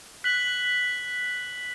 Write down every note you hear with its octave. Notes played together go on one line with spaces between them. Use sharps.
F#6 B6 F#7